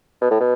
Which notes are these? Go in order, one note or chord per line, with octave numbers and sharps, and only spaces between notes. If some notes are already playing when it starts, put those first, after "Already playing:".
B2
A2
B2